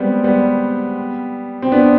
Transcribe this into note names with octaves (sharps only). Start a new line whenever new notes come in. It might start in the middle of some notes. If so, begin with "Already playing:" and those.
Already playing: G3 G#3 B3 C4
G3 B3
C4
B3 D4